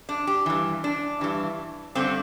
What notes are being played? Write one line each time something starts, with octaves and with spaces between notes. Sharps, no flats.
D4
G4
G2 E3
D4
G2 E3
G2 D3 C4